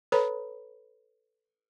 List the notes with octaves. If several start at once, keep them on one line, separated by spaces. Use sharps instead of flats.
A4 B4 C#5 A#5 B5